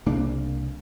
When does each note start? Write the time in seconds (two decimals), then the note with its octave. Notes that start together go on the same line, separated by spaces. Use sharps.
0.06 C2 C#3 A#3 D4